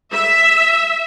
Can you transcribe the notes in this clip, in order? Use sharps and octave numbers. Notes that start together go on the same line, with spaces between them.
E5